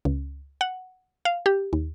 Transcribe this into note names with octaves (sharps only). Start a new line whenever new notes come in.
C#2
F#5
F5
G4
D#2